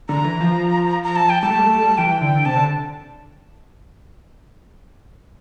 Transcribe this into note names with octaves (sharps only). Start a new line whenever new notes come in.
D3 A#5
E3
F3
A#5
A5
G5
G3 A5
A3
G3
A3
G3
E3 G5
D3
C3 A5
D3